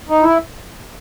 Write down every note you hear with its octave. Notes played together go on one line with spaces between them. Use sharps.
D#4
E4